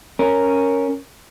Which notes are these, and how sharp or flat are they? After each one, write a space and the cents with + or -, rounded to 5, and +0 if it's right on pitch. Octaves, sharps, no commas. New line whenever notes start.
C#4 +0 A#4 +0